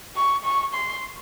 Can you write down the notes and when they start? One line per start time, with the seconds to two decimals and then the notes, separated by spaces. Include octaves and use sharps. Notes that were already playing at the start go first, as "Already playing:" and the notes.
0.16 C#6
0.44 C#6
0.74 C6